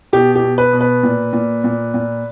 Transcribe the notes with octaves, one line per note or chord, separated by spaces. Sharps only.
B2 G4
G4
B2
B4
B2
B4
A#2
A#2
A#2
A#2